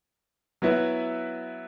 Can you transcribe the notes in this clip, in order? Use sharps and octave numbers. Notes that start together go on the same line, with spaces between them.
F#3 B3 E4 B4 E5